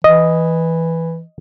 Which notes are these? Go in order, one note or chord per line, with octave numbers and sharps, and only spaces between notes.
E3 D#5